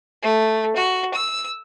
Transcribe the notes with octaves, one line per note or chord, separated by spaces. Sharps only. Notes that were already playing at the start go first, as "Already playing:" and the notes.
A3
F#4
E6